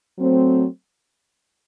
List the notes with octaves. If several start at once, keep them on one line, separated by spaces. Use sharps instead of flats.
F#3 A3 C4